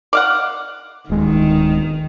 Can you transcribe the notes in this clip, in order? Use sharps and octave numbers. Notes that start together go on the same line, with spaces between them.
D5 F5 F#5
D1 D#3 G#3